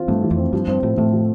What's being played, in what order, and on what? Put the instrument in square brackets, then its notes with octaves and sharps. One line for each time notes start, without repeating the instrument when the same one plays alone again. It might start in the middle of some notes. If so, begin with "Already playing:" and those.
Already playing: [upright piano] E3 C4 F4
[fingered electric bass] G2 [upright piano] A3
[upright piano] E3
[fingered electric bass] F2
[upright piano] C4
[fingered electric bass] G2 [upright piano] F3
[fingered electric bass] G2 [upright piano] C4
[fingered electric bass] A2 [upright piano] F3
[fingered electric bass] A2 [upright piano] A3
[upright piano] F3